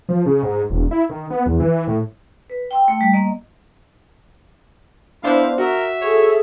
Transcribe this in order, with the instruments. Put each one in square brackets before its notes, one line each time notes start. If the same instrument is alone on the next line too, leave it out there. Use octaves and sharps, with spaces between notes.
[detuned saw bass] F3
C#3
G#2
E1
E4
D#3
B3
E2
E3
A2
[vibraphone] B4
G5 C6 E6
A3 G5
G3
A#3 D#5
[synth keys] B3 D4 C5 [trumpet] E4 [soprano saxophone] F5
[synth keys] F#4 [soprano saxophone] A#4 [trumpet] E5
[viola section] G#4 A4 [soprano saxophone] C#5